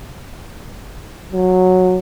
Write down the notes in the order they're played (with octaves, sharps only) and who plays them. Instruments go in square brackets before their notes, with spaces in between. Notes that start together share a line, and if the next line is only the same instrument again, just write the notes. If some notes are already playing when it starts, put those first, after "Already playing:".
[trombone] F#3